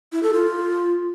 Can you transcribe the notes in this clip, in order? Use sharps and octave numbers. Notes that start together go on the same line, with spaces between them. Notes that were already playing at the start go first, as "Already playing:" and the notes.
E4
A4
F4